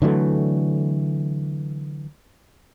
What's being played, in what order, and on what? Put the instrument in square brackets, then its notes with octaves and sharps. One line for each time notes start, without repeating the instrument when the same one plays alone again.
[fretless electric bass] D3 E3 F#3 A3